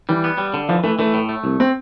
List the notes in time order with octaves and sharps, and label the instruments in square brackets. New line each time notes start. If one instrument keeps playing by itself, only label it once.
[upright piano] E3 [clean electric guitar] G3
[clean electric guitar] B3
G3
D3
[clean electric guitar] E3 [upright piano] F3
[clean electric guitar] E3 [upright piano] A3
[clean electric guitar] E3 [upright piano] A3
[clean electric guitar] A2
A3
C2
[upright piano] C4